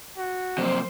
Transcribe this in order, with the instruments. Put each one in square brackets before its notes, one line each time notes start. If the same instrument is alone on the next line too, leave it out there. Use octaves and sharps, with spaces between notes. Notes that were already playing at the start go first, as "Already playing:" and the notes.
[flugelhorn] F#4
[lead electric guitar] C3 A#3 [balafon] F3 F#3 [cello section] C5